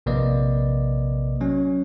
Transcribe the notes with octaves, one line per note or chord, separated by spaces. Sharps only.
A#1 C3 A#3 B4 D5 D#5
F#3 C#4